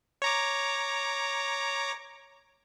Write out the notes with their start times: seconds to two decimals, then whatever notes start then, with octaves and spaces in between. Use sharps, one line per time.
0.22 C#5 A#5 D6